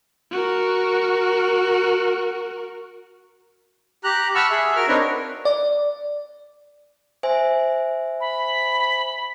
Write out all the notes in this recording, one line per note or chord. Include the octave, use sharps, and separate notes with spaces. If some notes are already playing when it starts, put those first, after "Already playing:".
F#4 A#4
G4 A#5 F#6
F#5 A5 B5 C#6 E6 F6
G#4 E5
F#4 A#4 F6
C4 D4 D#4 A#4 B4 C#5
D5
C5 E5 G#5
B5